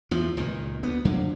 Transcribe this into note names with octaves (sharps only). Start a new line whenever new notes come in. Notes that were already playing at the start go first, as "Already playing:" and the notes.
E2 F3
C#2 A#2 D#3
D2 B3
F2 D3 F#3 A#3